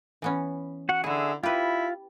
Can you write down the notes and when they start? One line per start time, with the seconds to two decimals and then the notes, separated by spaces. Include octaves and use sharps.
0.22 E3 B3 C#4
0.89 F#4 F#5
1.04 D3 E4 F#4 G#4 E5
1.43 E4 F4 G4 B4